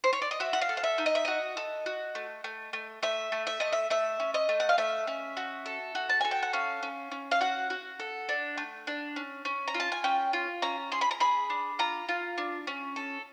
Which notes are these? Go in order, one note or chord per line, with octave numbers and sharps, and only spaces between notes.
C5
C#5
D5
D#5
F#4 E5
F#5
F5
A4
F5
E5
D#4
D#5
E5
F#4 D#5
A4
F#4
A3
A3
A3
A3 E5
A3
E5
A3 D#5
E5
A3 E5
C#4
D#5
A3
F#5
F5
A3 E5
C#4
F#4
A4
F#4
A5
A4 G#5
G5
F#5
C#4 F5
C#4
C#4
F5
F#4 F#5
F#4
A4
D4
A3
D4
C#4
C#4
A#5
F4
A5
G#5
C#4 G5
F4
C#4 A#5
G#4 C6
B5
A#5
G#4 B5
D4
F4 A#5
F4
D4
C#4
A4